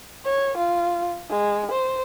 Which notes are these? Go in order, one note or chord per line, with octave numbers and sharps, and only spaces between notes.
C#5
F4
G#3
C5